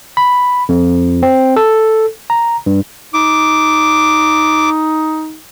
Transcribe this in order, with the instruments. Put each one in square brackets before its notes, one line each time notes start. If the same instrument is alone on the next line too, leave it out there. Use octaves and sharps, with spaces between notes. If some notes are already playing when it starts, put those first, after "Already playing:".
[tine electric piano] B5
F2
C4
A4
A#5
G2
[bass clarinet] D#4 [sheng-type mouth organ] D6